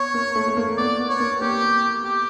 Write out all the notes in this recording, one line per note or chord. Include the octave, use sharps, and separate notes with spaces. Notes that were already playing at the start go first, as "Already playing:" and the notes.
Already playing: B3 C#5
A#3
A3
A3
A#3
B3 D5
B3
C#5
A#3
A#3 G4
G4